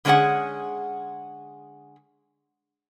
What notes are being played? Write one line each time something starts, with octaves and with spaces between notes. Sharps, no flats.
D3 G#3 C#4 D4 G#4 F#5